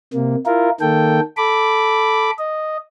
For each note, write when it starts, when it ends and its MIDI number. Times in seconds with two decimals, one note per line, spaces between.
0.14 0.36 48
0.14 0.36 58
0.46 0.70 64
0.46 0.70 65
0.46 0.70 70
0.81 1.20 51
0.81 1.20 58
0.81 1.20 69
0.81 1.20 79
1.37 2.31 69
1.37 2.31 83
1.37 2.31 86
2.39 2.77 75